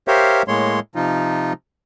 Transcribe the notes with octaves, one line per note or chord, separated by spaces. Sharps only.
G4 A#4 C5 C#5 E5 F5
A2 G#3 A#3 C#5 C6
C3 F3 D#4 F4